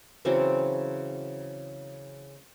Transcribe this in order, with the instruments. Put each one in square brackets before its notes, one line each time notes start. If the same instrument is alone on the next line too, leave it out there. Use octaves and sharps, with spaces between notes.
[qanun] C#3 E3 F#3 C4